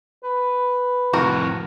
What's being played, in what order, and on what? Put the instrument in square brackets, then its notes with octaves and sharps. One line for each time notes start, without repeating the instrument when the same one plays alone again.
[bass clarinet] B4
[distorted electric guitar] F2 A2 [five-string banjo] F#4 A#4